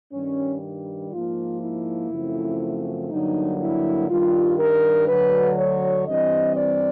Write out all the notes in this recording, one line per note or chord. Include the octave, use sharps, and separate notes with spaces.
G2 D#3 G3 C#4
G#2 F3 A#3 F4
E4
F#2 C#3 F3 A3 C4
G2 D3 F#3 A#3 D#4
E4
G2 D#3 G3 F4
A#4
D2 D3 F#3 B4
C#5
G2 E3 G3 C4 D#5
D5